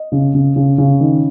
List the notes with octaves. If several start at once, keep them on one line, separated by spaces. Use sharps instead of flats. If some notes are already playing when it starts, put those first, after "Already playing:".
Already playing: D#5
C#3
C#3
C#3
C#3
D#3